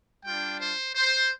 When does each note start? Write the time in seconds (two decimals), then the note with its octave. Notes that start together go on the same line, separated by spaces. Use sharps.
0.25 G3 D4 F4 G5
0.60 C5
0.95 C5